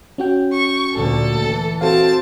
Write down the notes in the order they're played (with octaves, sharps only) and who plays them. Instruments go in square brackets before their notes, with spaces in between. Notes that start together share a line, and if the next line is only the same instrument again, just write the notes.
[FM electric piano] C#4 F#4 G5
[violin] C#6
[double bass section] D2 A#2 D3 [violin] A4
[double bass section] E3
[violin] C4 A5 [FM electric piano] F#4 A4 F5